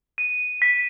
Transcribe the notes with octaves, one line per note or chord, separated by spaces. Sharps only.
D#7
B6